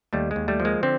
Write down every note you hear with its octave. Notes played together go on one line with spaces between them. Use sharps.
D#2 G3 A3
G#3
D#2
G3 A3
F3
G#3 A#3
D3 C4